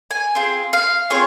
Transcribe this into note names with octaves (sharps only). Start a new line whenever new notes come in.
G#5
C4 F4 G#4
F5
C4 F4 G#4 C#5